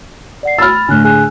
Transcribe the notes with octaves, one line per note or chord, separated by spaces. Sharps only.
D5 F#5 C7
B5 E6 F6 A6
A2 D3 G#5 F#6
G#4 G#5 F#6